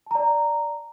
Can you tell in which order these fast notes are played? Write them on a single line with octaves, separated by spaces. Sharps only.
A5 A#5 D5